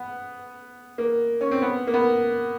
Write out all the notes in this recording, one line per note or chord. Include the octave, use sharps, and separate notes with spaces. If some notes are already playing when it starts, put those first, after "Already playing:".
Already playing: B3
A#3
C#4
C4
B3
A#3
B3